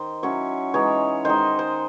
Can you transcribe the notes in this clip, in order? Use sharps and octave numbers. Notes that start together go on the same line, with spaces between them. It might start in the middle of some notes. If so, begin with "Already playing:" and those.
Already playing: D#3 C5
F#3 C#4 E4 C#5
E3 G#3 D#4 C#5
D#3 G#3 D#4 C5
C5